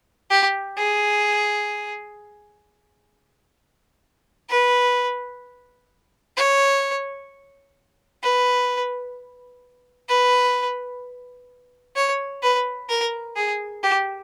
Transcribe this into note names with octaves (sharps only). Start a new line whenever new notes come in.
G4
G#4
B4
C#5
B4
B4
C#5
B4
A#4
G#4
G4